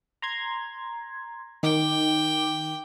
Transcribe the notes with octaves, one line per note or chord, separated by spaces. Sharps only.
A#5 C6 G#6
D#3 G5 D6